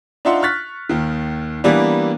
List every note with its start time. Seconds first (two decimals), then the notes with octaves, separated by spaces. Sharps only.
0.25 D4 D#4 F4 E5 F#5 C6
0.42 C#6 F6 F#6 A6 B6
0.89 D#2 D#3
1.64 E3 G3 A#3 B3 D4